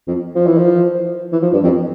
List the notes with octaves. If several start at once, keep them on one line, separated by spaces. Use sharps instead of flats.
F2
F3
E3
F3
E3
F3
G2
F2